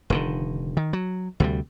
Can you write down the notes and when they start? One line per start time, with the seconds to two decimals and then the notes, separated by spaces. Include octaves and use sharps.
0.10 F1 D3 D#3
0.77 D#3
0.93 F#3
1.40 D2 C3 G3